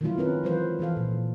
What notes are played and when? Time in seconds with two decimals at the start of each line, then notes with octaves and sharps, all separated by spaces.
0.01 D#3 F3 F#3 A3 E4 F4
0.17 C4 C#4 A#4 B4
0.43 E3 F#3 G#3 F4 B4 C5
0.79 E3 F3 A4 F5
0.97 A#2